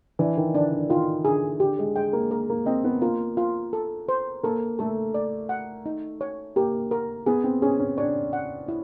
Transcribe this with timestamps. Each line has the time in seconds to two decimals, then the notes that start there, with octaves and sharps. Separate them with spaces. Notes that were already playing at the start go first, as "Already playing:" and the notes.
0.19 E3 D4
0.37 D#3
0.55 D3 D4
0.72 D3
0.89 D#3 F4
1.25 D3 G#4
1.60 D3 G4
1.79 G#3
1.96 G#3 G5
2.13 A#3
2.31 A#4
2.50 A#3
2.66 C4 D#5
2.84 B3
3.02 A#3 F4
3.37 F4
3.73 A4
4.09 C5
4.43 A#3 A4
4.79 A3 A4
5.14 D5
5.49 F#5
5.86 D#4
6.21 C#5
6.56 A#3 G4
6.91 A#4
7.26 B3 G#4
7.44 C4
7.62 C#4 G#4
7.80 C#4
7.98 D4 C#5
8.33 F#5
8.68 E4